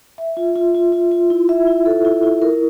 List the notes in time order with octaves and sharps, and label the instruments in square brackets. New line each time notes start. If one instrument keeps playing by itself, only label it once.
[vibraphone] E5
F4
F4
F4
F4
F4
E4
E5
E4
A4
E4
E4
A#4